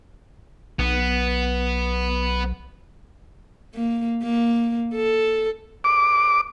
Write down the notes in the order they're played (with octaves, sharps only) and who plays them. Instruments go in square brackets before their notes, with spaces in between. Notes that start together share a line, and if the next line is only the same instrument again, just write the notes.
[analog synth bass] B1 [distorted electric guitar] B3
[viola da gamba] A#3
A#3
A4
[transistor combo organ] D6